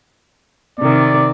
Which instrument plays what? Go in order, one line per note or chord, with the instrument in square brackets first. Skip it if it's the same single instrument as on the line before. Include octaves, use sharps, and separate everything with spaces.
[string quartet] C3 D#3 [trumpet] D5